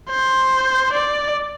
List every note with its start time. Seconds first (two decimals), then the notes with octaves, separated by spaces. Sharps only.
0.10 C5
0.93 D5